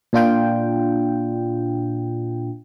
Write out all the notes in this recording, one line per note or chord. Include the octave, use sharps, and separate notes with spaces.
A#2 D4 F4 G5